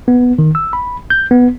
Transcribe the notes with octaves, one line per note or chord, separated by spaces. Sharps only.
B3
D#3
E6
B5
G6
B3